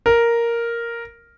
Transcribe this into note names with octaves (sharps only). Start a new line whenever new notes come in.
A#4